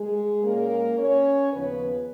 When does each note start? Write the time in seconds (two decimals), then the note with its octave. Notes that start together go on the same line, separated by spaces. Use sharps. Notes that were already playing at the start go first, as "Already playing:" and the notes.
Already playing: G#3 G#4
0.43 A#2 G#3 A#3 C#4 A#4
0.97 C#4 C#5
1.52 D#2 C#3 F3 B3 B4